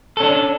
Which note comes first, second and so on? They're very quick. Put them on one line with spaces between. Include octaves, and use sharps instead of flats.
A4 C#4 D4